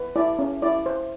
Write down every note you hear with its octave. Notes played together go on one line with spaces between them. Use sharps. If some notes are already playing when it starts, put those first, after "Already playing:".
Already playing: B4
E4 D5
C#4
E4 D5
C5